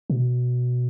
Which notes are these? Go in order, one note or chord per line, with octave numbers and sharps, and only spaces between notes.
B2